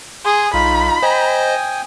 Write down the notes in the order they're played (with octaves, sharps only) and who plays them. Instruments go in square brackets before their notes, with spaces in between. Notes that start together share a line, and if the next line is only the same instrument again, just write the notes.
[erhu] G#4 [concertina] C6
[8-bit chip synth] B1 [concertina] D#4 F4 [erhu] B5
[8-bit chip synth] C5 D#5 [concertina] G5 G#5 D#6